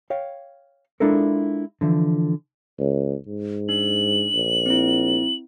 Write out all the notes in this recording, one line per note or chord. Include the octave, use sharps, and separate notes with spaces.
C#5 F5 G5
G#3 D4 E4 F4 A4 A#4
D3 E3 F3
C#2
G#2
D4 F#7
A#1
C4 E4